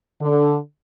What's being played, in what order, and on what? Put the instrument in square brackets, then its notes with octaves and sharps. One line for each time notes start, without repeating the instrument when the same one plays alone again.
[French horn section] D3